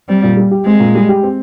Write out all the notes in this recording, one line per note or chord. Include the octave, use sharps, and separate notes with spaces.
G3 C4
A#2
G3
G4
G#3 C4
A#2
G3
G4
C4